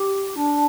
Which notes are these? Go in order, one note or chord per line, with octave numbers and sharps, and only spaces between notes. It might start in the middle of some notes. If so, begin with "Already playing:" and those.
Already playing: G4
D4